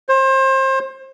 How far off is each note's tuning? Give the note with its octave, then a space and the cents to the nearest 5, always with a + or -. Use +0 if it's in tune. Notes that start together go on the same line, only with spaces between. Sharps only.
C5 +30